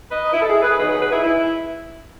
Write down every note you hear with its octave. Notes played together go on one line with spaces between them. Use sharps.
B4 D#5
D#4
E4
A4
E4 G#4
G#4 B4
D#3 F#3 B3 D#4 G#4 B4
G#4 B4
G#4 B4
E4 G#4
E4